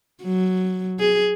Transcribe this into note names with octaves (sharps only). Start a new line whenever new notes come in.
F#3
G#4